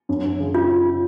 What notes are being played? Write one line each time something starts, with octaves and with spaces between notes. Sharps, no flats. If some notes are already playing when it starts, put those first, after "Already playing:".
F#2
F#2
C#3
F4